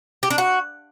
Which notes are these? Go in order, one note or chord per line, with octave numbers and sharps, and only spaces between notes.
G4
D4
F#4